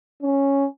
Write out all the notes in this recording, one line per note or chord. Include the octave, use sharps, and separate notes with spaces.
C#4